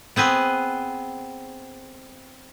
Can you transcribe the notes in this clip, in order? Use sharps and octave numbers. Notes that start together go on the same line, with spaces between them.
B3 C4 G#4 B4